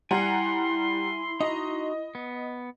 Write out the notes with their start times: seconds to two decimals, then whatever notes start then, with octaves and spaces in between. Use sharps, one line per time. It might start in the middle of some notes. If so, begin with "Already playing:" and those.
0.11 G3 E4 F#5 G#5 A#5 C6
1.40 D#4 F#4 D#5 A#5
2.15 B3